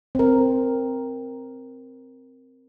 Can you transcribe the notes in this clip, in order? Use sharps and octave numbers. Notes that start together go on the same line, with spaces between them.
C4 A#4